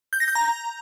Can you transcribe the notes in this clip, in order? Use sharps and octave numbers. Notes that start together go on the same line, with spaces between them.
G6
A#6
G6
A#5